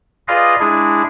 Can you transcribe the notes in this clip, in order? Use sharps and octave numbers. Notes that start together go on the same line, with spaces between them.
F4 G#4 B4 D5 D#5 F5
G#3 D4 E4 G#4